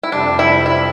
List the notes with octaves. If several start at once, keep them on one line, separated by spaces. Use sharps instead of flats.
E4
F2 C3 G3 D4
E4
E4